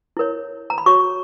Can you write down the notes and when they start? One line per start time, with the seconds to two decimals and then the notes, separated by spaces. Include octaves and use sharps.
0.17 E4 A#4 C#5
0.70 A#5
0.78 B5
0.86 F#4 C#5 C#6